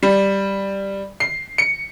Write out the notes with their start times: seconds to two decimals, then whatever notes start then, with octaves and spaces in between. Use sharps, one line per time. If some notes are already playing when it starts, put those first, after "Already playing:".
0.03 G3
1.20 C7
1.58 C#7